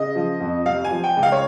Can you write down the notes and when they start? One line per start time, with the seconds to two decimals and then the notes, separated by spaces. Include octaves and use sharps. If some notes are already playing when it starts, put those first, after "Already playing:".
Already playing: C#3 D#5
0.15 F3
0.40 F2
0.65 C3 F5
0.85 G#5
0.91 F3
1.04 G5
1.16 C#2
1.23 F5
1.32 C#5